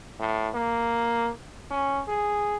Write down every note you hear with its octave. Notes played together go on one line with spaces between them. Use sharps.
A2
A#3
C#4
G#4